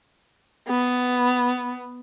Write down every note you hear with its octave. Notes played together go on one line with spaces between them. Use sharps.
B3